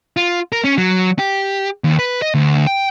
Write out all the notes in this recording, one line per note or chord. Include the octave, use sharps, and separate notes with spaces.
F4
A#4
C#4
F#3
G4
D#2
B4
D#5
D2
G5